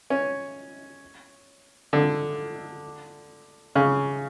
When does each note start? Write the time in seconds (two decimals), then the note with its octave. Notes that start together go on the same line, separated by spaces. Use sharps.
0.10 C#4
1.93 D3
3.75 C#3